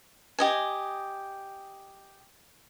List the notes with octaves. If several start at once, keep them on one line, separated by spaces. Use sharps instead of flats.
G4 D#5 G#5